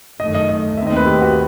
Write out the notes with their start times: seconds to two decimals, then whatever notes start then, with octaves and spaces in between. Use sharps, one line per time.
0.20 F#2 D#3 A3 D#5
0.35 D#5
0.49 D#5
0.77 D#2 D#3 A3 C4 E5
0.87 D#5
0.96 B4
1.06 G4
1.22 F#4